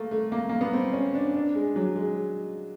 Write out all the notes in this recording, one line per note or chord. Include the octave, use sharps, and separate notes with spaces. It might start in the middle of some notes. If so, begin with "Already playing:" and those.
Already playing: A3 A#3
A3
A#3
A#3
B3
C4
C#4
D4
D4
G#3
F#3
G#3